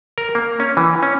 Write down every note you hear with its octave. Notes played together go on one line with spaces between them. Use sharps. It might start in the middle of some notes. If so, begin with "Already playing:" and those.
A#4
A#3
C#4
E3
C#4